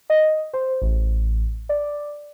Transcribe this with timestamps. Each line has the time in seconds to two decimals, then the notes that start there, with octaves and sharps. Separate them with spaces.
0.10 D#5
0.53 C5
0.82 A1
1.69 D5